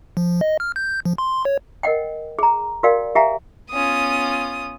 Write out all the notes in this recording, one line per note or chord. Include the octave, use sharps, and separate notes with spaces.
F3
D#5
F6
G6
F3
C6
C#5
A#4 D#5 F#5 G5
G#4 A#5
F#4 A#4 D5 F5 G5
G4 E5 F5 G#5 A#5
B3 C#4 F4 D#6